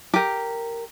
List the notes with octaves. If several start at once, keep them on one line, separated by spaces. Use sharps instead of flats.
G4 A#4